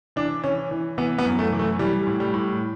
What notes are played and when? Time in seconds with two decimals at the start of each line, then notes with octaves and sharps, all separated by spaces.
0.16 E3 D4
0.44 E3 C#4
0.71 E3
0.98 E3 B3
1.18 B3
1.25 F#2
1.39 A3
1.52 E3
1.59 A3
1.79 E3 G3
2.07 A2
2.20 G3
2.34 A2